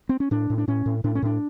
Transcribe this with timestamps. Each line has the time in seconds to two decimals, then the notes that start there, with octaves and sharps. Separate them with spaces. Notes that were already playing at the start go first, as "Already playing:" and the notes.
0.09 C4
0.20 C#4
0.31 A2 D4
0.50 A2
0.58 D4
0.68 A2 C#4
0.86 A2
1.04 A2 D4
1.15 C#4
1.22 A2 D4